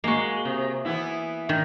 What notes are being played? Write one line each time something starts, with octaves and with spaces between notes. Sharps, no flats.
G#3 A#3 F#4
C3
E3 B3 E4
D#3